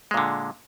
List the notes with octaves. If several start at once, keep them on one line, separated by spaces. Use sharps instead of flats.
A#2 D3 G#3